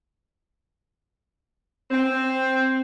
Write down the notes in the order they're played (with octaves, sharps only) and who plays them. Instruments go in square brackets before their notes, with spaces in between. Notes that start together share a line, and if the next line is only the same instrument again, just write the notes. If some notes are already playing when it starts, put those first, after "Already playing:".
[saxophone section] C4